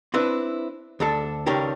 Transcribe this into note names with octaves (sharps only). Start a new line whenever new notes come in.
C4 D4 E4 B4
D2 D4 A4
C#2 D#3 C#4 D4 G4 A#4